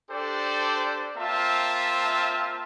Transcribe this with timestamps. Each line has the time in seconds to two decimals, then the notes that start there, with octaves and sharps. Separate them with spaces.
0.11 D4 G4 A4 C5 D5
1.17 A#3 C4 F4 E5 A5